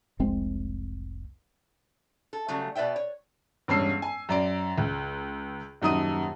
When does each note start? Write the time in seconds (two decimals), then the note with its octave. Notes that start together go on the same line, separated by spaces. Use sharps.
0.19 F1 C2 G#3 C4
2.33 A4
2.48 C#3 F#3 G3 A3
2.75 B2 B4 D5 E5 G5
2.96 C#5
3.68 E1 G2 C#4 E6 C7
4.02 G#5
4.29 F#2 D5 D7
4.78 C#2
5.82 D#1 F#2 D#4 D#6 D#7